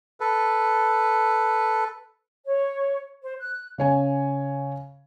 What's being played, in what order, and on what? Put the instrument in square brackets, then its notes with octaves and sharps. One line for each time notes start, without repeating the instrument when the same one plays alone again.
[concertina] A4 B4
[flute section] C#5
C5
F#6
[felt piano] C#3 C#5 G#5